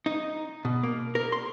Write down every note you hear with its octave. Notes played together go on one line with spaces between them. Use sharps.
D#4
B2
A#3
A#4
C6